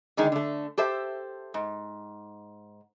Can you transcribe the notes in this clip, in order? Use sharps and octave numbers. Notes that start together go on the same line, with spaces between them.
D3 D#3 G#3 D#4
D3 A3
G4 A4 C5 E5
G#2